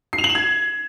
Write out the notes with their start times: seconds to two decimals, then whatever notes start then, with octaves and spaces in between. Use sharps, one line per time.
0.13 C7
0.18 F7
0.24 F#7
0.30 E7
0.35 G#6